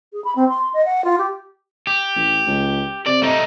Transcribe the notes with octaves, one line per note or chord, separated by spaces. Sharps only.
G#4
B5
C4
C6
D#5
F#5
F4
G4
G4
A1
C#2
C3 D5
A3 D#4